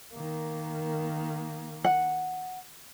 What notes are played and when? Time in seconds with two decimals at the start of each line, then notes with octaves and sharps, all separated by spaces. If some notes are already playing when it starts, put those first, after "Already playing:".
0.14 D#3 A#3
1.84 F#5